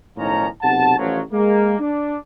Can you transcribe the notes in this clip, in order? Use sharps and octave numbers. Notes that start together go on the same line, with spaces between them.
B1 A2 D#3 F3 C#4 A#5
B1 C3 F#5 A5
A1 F3 F#3
G#3 A#3
D4